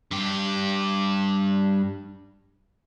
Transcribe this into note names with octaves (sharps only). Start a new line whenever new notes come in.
G2 G4